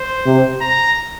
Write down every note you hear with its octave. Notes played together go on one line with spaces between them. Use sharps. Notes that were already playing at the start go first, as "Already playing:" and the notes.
Already playing: C5
C3
A#5